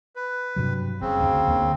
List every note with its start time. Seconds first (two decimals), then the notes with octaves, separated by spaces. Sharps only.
0.16 B4
0.56 G2 C3 F#3
1.01 F#1 C#3 C4
1.20 D2
1.48 D2 D3 A#3